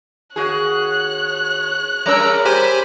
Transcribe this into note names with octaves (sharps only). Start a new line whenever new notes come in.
D#2 F#4 G#4 C#5 F#6
G3 C#4 A#4 A#5 E6
G4 C5 G#5 B5